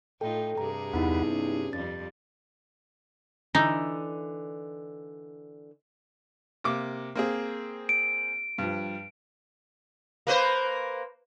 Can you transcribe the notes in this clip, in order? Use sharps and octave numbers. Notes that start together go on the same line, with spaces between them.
A2 D#4 F4 A4 G5
G2 C3 G#4 A#5
E2 B3 D#4 E4 F#5 B5
C#4
F2 F3 G3 A6
D3 E3 D#4
C3 A#3 D6
A#3 C4 G#4
D7
G2 F3
A#3 B4 C5